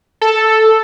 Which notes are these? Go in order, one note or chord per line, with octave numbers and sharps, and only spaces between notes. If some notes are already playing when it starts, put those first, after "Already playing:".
A4